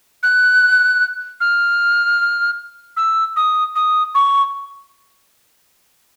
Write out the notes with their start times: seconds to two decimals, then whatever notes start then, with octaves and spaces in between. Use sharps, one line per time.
0.23 F#6
1.41 F6
2.97 E6
3.36 D#6
3.76 D#6
4.15 C#6